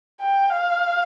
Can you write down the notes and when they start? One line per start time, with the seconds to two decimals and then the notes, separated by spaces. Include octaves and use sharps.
0.21 G5
0.50 F5